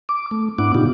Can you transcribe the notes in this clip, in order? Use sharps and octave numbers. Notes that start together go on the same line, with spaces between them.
D6
A3
G#2 B3 D4 E4 F#5 D6
A#2 C#3 B3 D#4 F4 G4